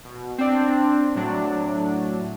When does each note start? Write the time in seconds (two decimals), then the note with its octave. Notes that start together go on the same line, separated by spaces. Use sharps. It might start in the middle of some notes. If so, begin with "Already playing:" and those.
0.05 B2
0.38 C4 D4
1.15 A2 F#3 D4